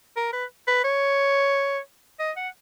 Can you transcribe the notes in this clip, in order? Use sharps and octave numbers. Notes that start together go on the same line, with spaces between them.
A#4
B4
B4
C#5
D#5
F#5